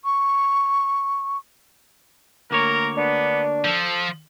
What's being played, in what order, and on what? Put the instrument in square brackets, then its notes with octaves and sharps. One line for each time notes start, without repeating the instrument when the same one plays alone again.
[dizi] C#6
[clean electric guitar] D2 A#3 C#5 [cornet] A#4
[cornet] B3 [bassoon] D4
[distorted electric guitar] F3 [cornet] A4